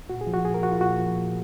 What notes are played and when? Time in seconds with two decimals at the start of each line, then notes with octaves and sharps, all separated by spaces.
0.10 A#2 F#4
0.21 G#4
0.27 F3
0.34 F#4
0.45 A#2 G#4
0.54 A#4
0.62 F3 F#4
0.71 F4
0.81 A#2 F#4
0.99 F3
1.17 A#2